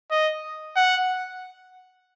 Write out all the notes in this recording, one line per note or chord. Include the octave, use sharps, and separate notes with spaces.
D#5
F#5